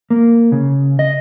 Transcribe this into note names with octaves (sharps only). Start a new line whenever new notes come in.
A#3
C#3
D#5